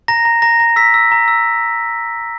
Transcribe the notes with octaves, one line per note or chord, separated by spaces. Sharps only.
A#5 A#6
A#5
A#5 A#6
A#5
E6 B6
E6
A#5
E6